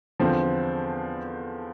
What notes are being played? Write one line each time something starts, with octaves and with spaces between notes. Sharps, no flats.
E2 D3 F3 C4